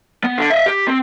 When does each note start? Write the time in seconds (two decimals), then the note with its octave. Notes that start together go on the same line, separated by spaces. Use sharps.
0.24 B3
0.38 D3
0.50 D#5 E5
0.66 G4
0.88 C4